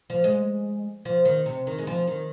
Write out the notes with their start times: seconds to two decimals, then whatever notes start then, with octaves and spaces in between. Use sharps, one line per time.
0.10 F3
0.24 G#3
1.05 F3
1.25 D#3
1.46 C3
1.67 D#3
1.78 G#3
1.87 F3
2.07 D#3